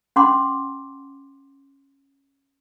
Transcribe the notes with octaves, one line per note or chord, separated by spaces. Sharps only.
C#4 F#5 C6 D6